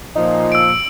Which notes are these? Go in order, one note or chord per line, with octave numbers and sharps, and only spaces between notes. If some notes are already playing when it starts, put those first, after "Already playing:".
A#2 F3 D#4
E6 D7